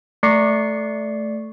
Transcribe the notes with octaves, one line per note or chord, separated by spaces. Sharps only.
A3 D5 C#6 C7 C#7